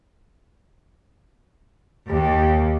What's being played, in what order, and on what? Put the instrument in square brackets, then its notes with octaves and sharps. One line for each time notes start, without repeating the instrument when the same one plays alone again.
[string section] D#2 [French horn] G4